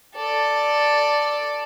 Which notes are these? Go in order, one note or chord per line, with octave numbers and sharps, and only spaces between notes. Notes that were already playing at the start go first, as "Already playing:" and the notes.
A4 D5